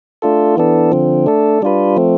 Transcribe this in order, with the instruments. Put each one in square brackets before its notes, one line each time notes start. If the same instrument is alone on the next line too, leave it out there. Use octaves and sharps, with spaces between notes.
[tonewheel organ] A3 D4 F4 A4
E3 B3 D4 A4
D3 F3 C4
A3 D4 A4
G3 D4 F4 B4
F3 A3 C4